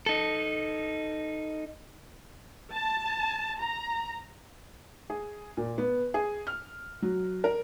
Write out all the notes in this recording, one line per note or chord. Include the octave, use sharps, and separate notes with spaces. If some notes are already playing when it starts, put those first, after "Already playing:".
D#4 A4
A5
A#5
G#4
A#2
B3
G#4
F6
F#3
A#4